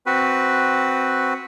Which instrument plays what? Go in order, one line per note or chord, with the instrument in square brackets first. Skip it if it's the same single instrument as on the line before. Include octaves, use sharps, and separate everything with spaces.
[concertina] C4 F#4 B4